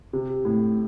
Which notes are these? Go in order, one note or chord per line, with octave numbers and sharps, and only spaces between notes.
C3
A2